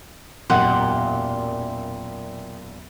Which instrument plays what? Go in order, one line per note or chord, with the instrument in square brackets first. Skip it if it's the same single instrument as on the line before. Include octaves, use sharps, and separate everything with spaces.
[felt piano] E1 F#2 [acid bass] A#2 [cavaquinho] G4 F#5 [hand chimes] C6